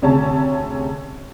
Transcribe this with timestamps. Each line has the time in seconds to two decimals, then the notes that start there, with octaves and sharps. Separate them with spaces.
0.02 D2 C3 C#4 G#4 A5